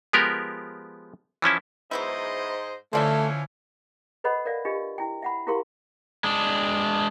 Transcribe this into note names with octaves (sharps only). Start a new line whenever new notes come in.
F3 G#3 B3 G4 A#4
E3 F3 C#4 E4
G#2 F#3 B3 E4 C5 D#5
D3 E3 F3 A3 C#4 C5 D5 E5
A4 B4 C5 D#5 F#5 B5
A#4 D5 E5 F5
D4 F4 G4 D#5
E4 G5
E5 F#5 B5
E4 F4 G4 A#4 F5 C6
G#3 D4